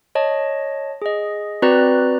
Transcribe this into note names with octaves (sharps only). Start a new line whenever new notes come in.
C#5 D#5 A5
G#4 D#5
C4 F#4 B4 D5 A#5 F#6